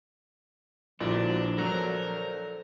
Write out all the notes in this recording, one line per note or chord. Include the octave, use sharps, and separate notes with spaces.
A#1 A#2 D3 F3 D4 E4 F#4 B4
F#3 A4 A#4 C5 D5